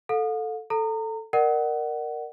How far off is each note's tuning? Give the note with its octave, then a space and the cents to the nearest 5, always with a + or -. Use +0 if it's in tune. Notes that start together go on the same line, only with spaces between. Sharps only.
A4 +0 F5 +45
A4 +0 A#5 -30
A#4 +0 D5 +40 F#5 +20